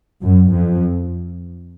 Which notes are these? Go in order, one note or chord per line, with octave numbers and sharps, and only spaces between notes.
F#2
F2